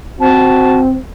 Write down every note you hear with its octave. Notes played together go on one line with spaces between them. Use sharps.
C4 F#4 A5